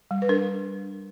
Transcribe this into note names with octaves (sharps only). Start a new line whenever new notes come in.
G3
B4
D4 A#4